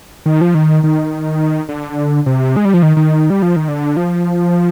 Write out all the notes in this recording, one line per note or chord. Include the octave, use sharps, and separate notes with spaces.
D#3
F3
D#3
D#3
D3
C3
G#3
G3
F3
D#3
D#3
G3
F3
D#3
D3
F3